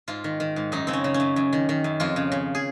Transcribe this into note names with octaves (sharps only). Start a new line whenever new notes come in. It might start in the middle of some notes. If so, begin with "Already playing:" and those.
G#2 F4
D#3
D#3
G#2
F#2 D#4
C#3 C4
C#4
C#3
C#4
F#2
F#2
D#3
D#3
F#2
F2 F4
C#3
C#3
G#4